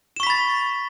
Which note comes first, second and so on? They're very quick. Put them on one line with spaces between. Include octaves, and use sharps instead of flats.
E7 C#6 B6 B5 A6